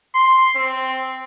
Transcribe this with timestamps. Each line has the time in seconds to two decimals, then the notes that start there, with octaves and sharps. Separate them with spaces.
0.15 C6
0.56 C4